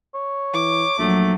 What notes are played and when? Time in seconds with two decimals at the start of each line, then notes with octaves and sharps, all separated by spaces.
0.15 C#5
0.54 E3 D6
0.99 A#1 F#3 A3